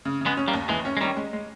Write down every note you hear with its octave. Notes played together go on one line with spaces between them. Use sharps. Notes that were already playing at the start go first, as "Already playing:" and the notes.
C#3
C#3
G#3 B3
C#4
G3 A#3
D#2
D#2 E3 G#3
C#4
G#3
D#3 G3 C#4
G#3
G#3